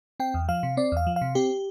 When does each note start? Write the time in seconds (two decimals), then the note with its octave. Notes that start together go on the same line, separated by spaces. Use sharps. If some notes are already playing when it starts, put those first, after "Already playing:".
0.20 C4 G5
0.34 E2
0.48 F3 F5
0.63 C3
0.77 C4 D5
0.92 E2 F5
1.07 F3
1.16 F5
1.21 C3
1.35 C4 G4